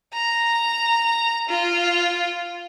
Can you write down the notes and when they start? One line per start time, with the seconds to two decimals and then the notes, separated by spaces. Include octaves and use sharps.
0.13 A#5
1.49 F4